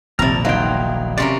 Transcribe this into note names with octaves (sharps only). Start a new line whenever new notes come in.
D#1 A#1 F2 C3 E4 D5 A#5 F6
G1 F#3 D#4 F5 G5 C6
C3 C#4 A#4 D5 C6 D6